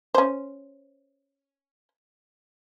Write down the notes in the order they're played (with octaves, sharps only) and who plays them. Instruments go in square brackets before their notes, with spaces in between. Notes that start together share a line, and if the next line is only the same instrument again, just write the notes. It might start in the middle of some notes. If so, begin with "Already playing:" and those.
[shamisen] C#4 C5